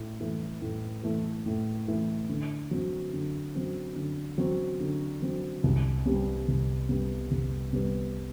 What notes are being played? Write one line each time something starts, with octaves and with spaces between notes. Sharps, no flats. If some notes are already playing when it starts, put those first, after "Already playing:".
Already playing: A2 A3 E4
E3 A3 E4
A2
E3 A3 E4
A2
E3 A3 E4
D3
F#3 C4
D3
F#3 C4
D3
F#3 C4
D3
F#3 C4
C2
C3 G3 B3
C2
C3 G3 B3
C2
C3 G3 B3